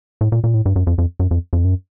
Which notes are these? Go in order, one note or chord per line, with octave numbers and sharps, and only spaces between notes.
A2
A#2
A#2
A2
G2
F#2
F2
F2
F#2
F2
F2
F#2